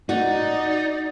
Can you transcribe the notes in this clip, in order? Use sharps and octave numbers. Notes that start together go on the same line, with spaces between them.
D#4 F#4 D5